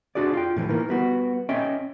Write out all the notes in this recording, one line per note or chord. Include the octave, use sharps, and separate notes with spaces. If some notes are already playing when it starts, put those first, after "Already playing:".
D4 F#4 G#4 D5
F4 G5
A2 E3 F3
D#3 E3 A#3
G3 B3 F#4
C#4 D#5 E5 G5